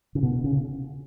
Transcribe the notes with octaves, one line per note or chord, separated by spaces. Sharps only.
C#3
B2
C#3